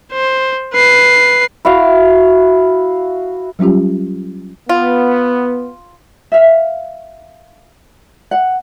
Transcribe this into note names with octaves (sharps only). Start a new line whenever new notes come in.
C5
B4 C7
E4 F#4 E5 F5
F#3 G3 C#4 F4 G4
B3 F4
E5 F5
F#5